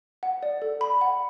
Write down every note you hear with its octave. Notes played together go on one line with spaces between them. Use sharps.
F#5
D5
A4
B5
F#5